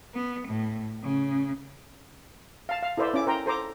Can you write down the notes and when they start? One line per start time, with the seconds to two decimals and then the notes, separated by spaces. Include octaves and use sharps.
0.14 B3
0.47 A2
1.04 C#3
2.69 F5 A5
2.83 F5
2.97 E4 A4 B4 C5 D5 E5
3.14 C#4 E4 D6
3.26 A#4 C5 G5 A#5
3.46 A4 C5 A#5 D6